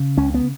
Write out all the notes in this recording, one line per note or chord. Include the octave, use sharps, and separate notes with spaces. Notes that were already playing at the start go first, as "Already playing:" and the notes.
Already playing: C#3
C#2 C#4
B3